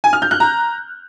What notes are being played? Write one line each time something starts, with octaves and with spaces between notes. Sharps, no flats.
G#5
F6
G6
F#6
A#5